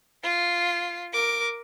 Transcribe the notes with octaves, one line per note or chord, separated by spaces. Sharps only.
F4 C7
A#4 D6